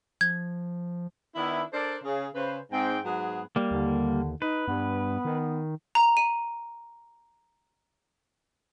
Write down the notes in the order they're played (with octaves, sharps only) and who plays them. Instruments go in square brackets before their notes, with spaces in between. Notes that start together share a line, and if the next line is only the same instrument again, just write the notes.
[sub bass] F3 [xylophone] G#6
[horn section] D#3 B3 D4 E4
D4 A4 A#4 C5 D5
C#3 G#4
C#3 B4 C5
G#2 C4 G5
G#2 F#3 B3 G#4
[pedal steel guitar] G3 A#3
[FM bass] D#2 [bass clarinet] D3
[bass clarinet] D#4 [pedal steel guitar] B4
[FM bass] G2 [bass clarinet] B3
[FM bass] D#3
[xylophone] A#5
D#7